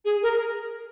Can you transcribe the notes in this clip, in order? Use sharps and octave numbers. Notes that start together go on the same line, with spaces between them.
G#4
A#4